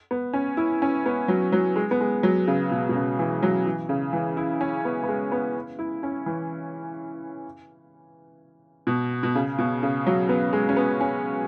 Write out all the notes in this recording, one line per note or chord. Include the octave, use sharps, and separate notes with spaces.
B3
C#4
E4
C#4
B3
F#3
F#3
G#3
B3
G#3
F#3
C#3
B2
B2
C#3
E3
F#3
E3
C#3
E3
E4
C#4
B3
B3
G#3
B3
E4
C#4
E3
B2
B2
C#3
B2
C#3
F#3
B3
G#3
C#4
B3
C#4